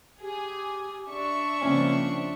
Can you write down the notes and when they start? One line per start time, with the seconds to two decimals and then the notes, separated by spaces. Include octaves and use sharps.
0.21 G4 G#4
1.09 D4 E5 C#6
1.61 C#3 F3 A#3 C4 C#4